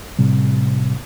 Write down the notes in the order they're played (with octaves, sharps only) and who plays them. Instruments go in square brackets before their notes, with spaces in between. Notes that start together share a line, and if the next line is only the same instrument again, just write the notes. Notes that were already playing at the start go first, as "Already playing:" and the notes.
[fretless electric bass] A2 C3 G3